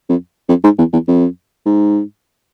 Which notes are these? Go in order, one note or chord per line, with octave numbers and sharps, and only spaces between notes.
F2
F2
G#2
E2
E2
F2
G#2